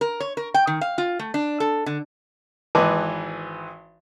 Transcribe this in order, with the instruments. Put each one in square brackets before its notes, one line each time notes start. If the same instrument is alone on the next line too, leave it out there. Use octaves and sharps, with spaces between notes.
[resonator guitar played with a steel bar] A#4
C#5
A#4
G5
D#3
F5
F4
A3
D4
A4
D3
[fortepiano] G#1 E3 B4 D#5 A5 D6